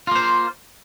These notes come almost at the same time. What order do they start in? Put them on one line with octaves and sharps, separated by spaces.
F4 A#3 C5